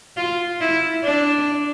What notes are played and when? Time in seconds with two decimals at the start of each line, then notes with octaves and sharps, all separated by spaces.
0.17 F4
0.61 E4
1.04 D4